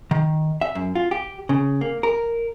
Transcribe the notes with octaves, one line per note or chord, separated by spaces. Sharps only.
D#3
E5
F#2
F4
G4
C#3
A#3
A#4